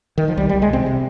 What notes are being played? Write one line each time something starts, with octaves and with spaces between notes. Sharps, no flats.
D#3
F3
C2 G3
C2 G3
G#3
C3 C4
C3